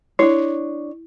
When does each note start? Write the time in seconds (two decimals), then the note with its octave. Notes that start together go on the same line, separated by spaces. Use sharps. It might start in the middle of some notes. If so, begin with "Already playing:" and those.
0.19 D4 E4 C#5